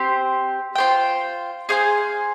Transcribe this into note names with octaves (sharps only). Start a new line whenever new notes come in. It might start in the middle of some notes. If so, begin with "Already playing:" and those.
Already playing: C4 G4 C5
F4 C5 G5
G#4 C5 F5 G#5